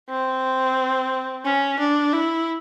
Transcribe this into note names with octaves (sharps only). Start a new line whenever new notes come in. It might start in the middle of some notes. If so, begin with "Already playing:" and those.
C4
C#4
D4
E4